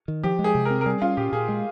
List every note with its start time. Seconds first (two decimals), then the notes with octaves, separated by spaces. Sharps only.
0.08 D#3
0.23 F3 G4
0.39 G#3
0.44 G#4
0.55 C3
0.65 C4 A#4
0.81 A#4
0.86 G3 G#4
1.02 C#4 F4
1.17 A#2 G4
1.32 A#2 G#4
1.48 G#3